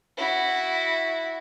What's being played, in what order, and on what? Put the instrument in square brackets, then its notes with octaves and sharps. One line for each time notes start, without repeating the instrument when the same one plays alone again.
[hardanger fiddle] E4 F#4